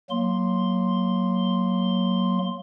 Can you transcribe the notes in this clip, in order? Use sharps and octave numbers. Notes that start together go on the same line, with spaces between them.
F#3 A#3 C6